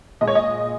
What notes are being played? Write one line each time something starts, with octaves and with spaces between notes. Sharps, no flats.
A#2 G#3 D#5
C#5
D#5